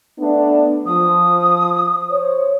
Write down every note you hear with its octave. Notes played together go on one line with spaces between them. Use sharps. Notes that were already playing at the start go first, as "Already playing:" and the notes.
A3 B3 D4
F3 D#6
C5 C#5